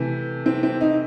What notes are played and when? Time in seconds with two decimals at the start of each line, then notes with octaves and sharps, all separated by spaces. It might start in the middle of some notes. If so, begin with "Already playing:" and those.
Already playing: C3 E3 A3
0.46 C4
0.63 C4
0.81 D#4